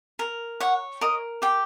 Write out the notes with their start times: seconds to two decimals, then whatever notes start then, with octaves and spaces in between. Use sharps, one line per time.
0.19 A#4
0.60 C#5 F#5
1.01 A#4 D#5
1.42 G4 G5